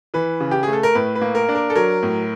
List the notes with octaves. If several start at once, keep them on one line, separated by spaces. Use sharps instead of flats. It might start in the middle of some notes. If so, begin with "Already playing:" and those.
E3 B4
C#3
G4
A3 G#4
A4
A#4
A2 B4
B4
A#3
A#4
D4
A#4
A4
F#3 A#4
A2